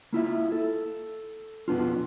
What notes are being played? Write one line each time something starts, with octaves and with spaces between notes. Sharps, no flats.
A#3 E4 F4 E5
A4
B1 F2 B3 D4 F4